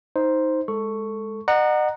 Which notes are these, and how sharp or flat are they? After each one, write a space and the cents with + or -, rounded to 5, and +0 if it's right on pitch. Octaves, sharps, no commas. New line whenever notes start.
D#4 +15 C5 +0
G#3 +0 A4 +10 C#6 +0
D#5 -40 F#5 +0 A#5 +0